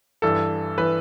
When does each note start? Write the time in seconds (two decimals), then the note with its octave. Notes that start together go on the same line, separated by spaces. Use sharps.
0.22 G2 E3 A4
0.78 E3 B4